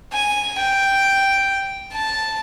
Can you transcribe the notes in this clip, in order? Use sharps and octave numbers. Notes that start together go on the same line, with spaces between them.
G#5
G5
A5